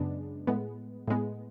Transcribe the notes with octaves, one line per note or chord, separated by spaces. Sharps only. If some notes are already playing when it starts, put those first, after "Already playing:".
Already playing: F#2 C#3 G#3 B3 D4
A2 G#3 B3
A2 G#3 B3